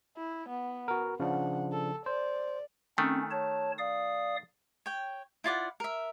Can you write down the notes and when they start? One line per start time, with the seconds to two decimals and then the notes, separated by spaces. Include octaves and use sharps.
0.17 E4
0.48 B3
0.88 F#4 A#4
1.20 C#3 F3 D4 F#5
1.72 A4
2.06 C5 D5
2.98 D#3 A3 C4 C#4
3.30 C#5 A5
3.78 D5 F5 D#6
4.86 C#5 G5
5.44 E4 F4 D5 F#5
5.80 A#4 E5